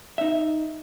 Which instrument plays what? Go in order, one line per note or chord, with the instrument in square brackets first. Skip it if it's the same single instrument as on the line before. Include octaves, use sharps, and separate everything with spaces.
[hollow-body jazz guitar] D#4 E5